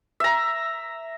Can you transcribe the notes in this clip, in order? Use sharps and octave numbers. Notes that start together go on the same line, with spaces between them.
E5 A#5